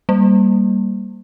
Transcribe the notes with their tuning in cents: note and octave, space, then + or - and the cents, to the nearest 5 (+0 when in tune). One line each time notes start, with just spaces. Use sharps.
G3 +0 A#3 +0